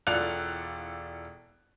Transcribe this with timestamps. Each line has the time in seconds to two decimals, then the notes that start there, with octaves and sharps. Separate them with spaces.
0.07 E1 F4 A4 D5 F#6 F7